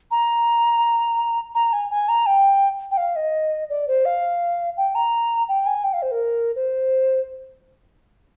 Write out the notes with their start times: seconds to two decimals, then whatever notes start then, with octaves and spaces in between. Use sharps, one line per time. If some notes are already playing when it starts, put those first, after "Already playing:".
0.11 A#5
1.55 A#5
1.73 G#5
1.90 G#5
2.08 A#5
2.26 G5
2.91 G5
2.97 F5
3.16 D#5
3.69 D5
3.88 C5
4.05 F5
4.77 G5
4.95 A#5
5.48 G5
5.66 G#5
5.84 G5
5.93 F5
6.02 C5
6.11 A#4
6.55 C5